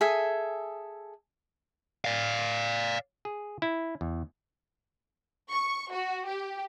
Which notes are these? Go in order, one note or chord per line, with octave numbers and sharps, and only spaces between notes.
G#4 A4 E5 G#5
D5 F5
G#4
E4
E2
C#6
F#4
G4